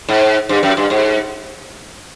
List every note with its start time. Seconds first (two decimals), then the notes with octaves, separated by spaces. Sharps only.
0.09 G#2
0.49 G2
0.63 F#2
0.77 G2
0.90 G#2